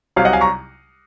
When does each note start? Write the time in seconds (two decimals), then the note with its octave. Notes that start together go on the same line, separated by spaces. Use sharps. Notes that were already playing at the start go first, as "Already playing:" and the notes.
0.16 C2 C3 F#3 C#5 F5
0.25 D#5 F#5
0.33 F5 G#5
0.41 A#5 C#6